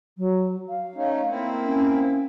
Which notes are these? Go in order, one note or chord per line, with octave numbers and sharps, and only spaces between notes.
F#3
F5
A3 C#4 D#4
A#3 C4 E4
C#4